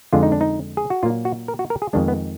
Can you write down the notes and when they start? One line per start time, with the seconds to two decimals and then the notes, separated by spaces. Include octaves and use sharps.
0.13 F2 D3 G#3 F4
0.23 D#4
0.32 D4
0.41 D#4
0.77 G#4
0.90 F#4
1.03 A#2 F#3 A#3 F4
1.25 F#4
1.48 A#4
1.59 F#4
1.70 A#4
1.82 G#4
1.93 F2 D#3 G#3 D4
2.08 B3